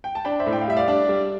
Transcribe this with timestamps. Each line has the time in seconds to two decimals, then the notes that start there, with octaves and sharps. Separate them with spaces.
0.04 G5
0.15 A5
0.25 D4 G5 B5
0.40 C5 E5
0.46 A2
0.53 G5
0.61 F5
0.68 G3 E5
0.77 D5 F5
0.88 D4
1.09 G3